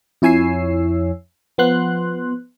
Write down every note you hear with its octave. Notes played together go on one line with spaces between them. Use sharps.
F2 E4 C#5 G#5 E6 C7
F3 B3 C6 F#6